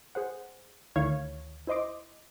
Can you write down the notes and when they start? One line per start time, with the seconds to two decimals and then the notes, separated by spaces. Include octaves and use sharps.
0.15 G#4 C5 F#5
0.96 D2 D#3 E4 C#5 F5 G#6
1.67 E4 C5 D#5 C6 D6